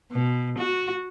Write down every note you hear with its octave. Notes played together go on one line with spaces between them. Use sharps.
B2
F#4